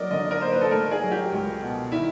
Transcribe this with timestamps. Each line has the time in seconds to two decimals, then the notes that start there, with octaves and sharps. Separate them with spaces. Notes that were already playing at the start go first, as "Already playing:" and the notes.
Already playing: F#3 A#3 A#4 D5 D#5
0.11 D3 D#5
0.31 A#4
0.41 A#3 C5
0.51 B4
0.61 A4
0.71 A3 A#4
0.91 G#4
1.02 F#3
1.11 G4
1.32 C#2
1.62 B2
1.92 D#3 E4